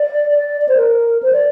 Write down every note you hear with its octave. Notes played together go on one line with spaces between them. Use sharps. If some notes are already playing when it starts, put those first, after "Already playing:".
Already playing: D5
D5
D5
C5
A#4
C5
D5